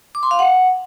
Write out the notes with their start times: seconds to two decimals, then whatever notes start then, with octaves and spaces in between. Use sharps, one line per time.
0.15 D6
0.23 C6
0.31 F5
0.39 F#5